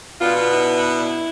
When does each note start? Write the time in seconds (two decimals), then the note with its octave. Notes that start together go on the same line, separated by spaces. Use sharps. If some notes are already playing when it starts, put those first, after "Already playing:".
0.21 B2 B3 D4 F4
0.37 F4
0.52 E4